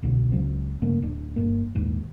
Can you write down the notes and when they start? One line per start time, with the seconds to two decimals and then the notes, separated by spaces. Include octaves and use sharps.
0.02 D#1 C2 B2 D3
0.32 C#2 C#3 F#3 C4
0.82 G2 C#3 A3 A#3
1.02 D1 D4
1.36 G1 G2 A#3
1.75 D#1 A#1 D#2 G#2